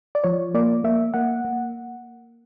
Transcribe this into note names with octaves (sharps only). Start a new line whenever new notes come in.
D5
F3 C#5
A#3 D5
A#3 E5
A#3 F#5
A#3